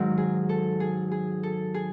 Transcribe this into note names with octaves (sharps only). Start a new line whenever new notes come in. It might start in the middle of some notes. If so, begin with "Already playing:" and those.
Already playing: G#2 D#3 F#3
G#4
A4
G#4
G#4
A4
G#4